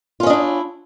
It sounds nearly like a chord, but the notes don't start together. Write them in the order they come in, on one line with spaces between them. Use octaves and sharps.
F4 C#4 D#5 D4 E4